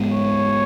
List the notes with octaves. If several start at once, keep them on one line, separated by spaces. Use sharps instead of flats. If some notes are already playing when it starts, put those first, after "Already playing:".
Already playing: G#2 G#3 B3
C#5